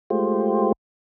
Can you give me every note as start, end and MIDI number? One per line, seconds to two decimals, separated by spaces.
0.10 0.72 56
0.10 0.72 57
0.10 0.72 65
0.10 0.72 67
0.10 0.72 72